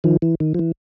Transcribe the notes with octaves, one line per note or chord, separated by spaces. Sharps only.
D#3 F3
E3
D#3
F3
E3